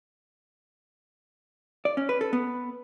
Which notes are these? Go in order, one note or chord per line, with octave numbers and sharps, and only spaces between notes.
D5
C#4
B4
A4
B3